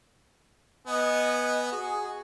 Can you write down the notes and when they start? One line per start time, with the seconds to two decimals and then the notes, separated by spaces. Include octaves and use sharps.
0.87 B3 D#5 G#5
1.72 F#4 G#4